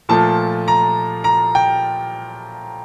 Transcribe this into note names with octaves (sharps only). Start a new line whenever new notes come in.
A#2 F3 A3 A5
A#5
A#5
G5